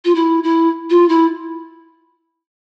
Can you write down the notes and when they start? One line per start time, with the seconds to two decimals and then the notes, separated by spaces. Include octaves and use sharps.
0.05 F4
0.15 E4
0.43 E4
0.90 F4
1.09 E4